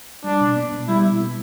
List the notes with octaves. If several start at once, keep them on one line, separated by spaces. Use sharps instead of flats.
G3 D4
B2
B3
B2
G3 E4
B2
B3